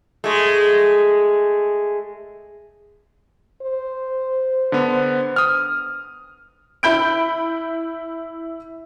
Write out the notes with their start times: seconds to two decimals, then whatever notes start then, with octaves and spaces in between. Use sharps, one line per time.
0.24 G#3 A3
3.62 C5
4.72 D3 B3
5.36 D#6 F6
6.83 E4 B5 G6 D7